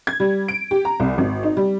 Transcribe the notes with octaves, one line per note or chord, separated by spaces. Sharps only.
G#6
G3
D7
G4
A#5
C2
G#1
D#4
G3